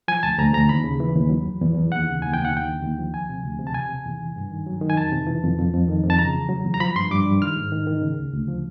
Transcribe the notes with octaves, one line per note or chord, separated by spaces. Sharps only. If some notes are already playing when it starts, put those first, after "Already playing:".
F3 G#5
D2 A5
D2 A#5
D2 A#5
D#2 B5
C#3
E3
D#2
F#3
E2
E2
E2
D#2 F#5
C#3
D#2 G#5
D#2 G5
F#5
D#2 G5
D3
D#2
F3
D2 G#5
C3
D2
C3
A5
E2 G#5
C3
E2
E3
G2
D#3
F#3
D#3
G#5
F2 A5
C3
E3
F2
F2
F2
D#3
F2
A5
C#3 A#5
E2
F#3
E2
A#5
F3 B5
G2 C6
G2 D6
G2
D#3 F6
G#2
D#3
D#3
C#3
D2
D2
F3